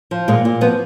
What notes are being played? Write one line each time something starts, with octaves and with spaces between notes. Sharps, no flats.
F3
A#2 G#3
A#2
F3 B3